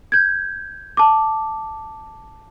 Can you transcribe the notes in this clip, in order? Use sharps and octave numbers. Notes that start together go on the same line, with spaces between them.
G6 G#6
A5 D6